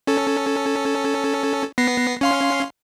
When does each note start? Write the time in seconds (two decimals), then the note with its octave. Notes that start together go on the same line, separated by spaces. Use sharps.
0.07 C#4 A4
1.78 B3 A#6 C7
2.21 C#4 F5 C6